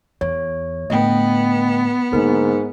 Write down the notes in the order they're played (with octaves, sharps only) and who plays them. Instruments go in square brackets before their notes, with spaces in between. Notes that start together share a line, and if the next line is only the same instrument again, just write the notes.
[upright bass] E2 [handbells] C#5
[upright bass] A2 D3 [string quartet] B3 [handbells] D#5 G5
[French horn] G#2 [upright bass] D3 A#3 [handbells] A#4